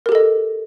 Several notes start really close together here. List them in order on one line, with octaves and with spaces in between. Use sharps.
A#4 G4 A4 D#5